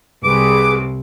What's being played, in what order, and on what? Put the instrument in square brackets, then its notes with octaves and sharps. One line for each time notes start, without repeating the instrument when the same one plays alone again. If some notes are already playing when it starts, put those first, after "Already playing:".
[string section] C2 [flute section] G#4 B4 [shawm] D6